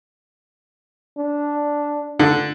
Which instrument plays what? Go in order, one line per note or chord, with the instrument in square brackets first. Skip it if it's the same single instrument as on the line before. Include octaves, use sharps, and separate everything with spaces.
[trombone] D4
[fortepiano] D3